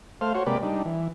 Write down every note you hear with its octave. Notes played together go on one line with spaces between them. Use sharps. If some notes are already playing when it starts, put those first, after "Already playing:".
A3 C5 F5
F#4 C5 C#5
C3 G#3 A#3 G4 B4 D5
G3 D4 D#4
E3